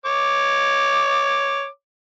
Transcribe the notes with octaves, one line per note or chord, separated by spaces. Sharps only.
C#5 D6